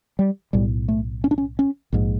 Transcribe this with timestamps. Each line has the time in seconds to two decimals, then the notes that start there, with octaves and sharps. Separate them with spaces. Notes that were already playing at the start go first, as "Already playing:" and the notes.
0.19 G3
0.53 B1 A2 G3
0.88 A3
1.24 C#4
1.31 D4
1.38 C#4
1.59 C#4
1.92 A#1 G#2